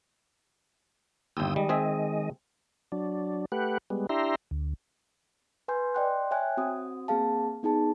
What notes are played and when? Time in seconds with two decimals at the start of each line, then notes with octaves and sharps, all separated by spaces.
1.37 G1 D#2 G5 D#6 E6
1.56 D#3 G3 G#3 D#5
1.69 C4 G#4 E5
2.92 F#3 D4
3.52 A3 G4 B4 F#5
3.90 G3 G#3 B3
4.09 D4 E4 G4 E5 A#5 C6
4.51 D2
5.68 B4 G#5 C6 G6
5.95 D5 D#5 G5 C6 F#6
6.31 C#5 E5 G5 G#5 F#6
6.57 C4 F#4 D#6
7.08 A#3 C4 G#4 F5 A5
7.63 B3 D#4 G#4 A5